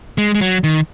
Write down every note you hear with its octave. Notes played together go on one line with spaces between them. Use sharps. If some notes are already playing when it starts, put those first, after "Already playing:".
G#3
G#3
F#3
D#3